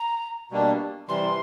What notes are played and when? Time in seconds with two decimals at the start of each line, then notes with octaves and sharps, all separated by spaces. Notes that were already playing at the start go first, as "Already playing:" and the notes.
Already playing: A#5
0.51 B2 G3 A#3 D4
1.08 C3 E3 G3 C6